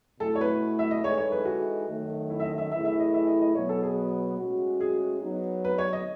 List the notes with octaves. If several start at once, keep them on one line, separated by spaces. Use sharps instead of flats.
B2 A3 E4 A4
C#5
B4
E5
D#5
E3 G#3 D#4 A4 C#5
C#5
B4
F#4
F#2 D#3 A3
E4
E5
D#5
E5
A2 E3 A3 E4 G#4 E5
E5
D#5
E5
D#5
D#5
B2 F#3 B3 C#5
A4
G#4
A2 G#3 C#4 F#4
G#4
F#3 B3 D#4
B4
C#5
D#5